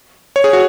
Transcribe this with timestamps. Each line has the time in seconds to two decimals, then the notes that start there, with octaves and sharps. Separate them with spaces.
0.36 C#5
0.44 G#4
0.53 F#4